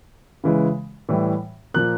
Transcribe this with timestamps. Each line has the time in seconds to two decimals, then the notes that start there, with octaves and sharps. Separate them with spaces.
0.44 C#3 E3 G#3
1.09 A2 E3 G3
1.74 A#2 F3 A#3 F#6